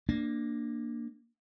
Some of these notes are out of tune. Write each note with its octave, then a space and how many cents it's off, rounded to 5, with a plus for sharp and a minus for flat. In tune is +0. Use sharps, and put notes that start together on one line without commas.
A#3 +0 D4 +10